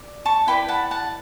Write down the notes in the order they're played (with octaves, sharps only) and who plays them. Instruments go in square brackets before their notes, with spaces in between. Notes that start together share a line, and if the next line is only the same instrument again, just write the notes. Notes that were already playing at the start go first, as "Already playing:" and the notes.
Already playing: [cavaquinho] D5
A5 C#6
E4 B4 D5 G5 B5
F#5 A5
F#5 A5